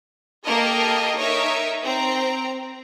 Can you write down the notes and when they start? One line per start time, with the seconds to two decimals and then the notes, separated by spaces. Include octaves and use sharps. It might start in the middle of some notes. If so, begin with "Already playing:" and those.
0.45 A#3 G4 A4 A#4 D#5
1.16 D#4 A#4 C#5 E5
1.84 C4 A#5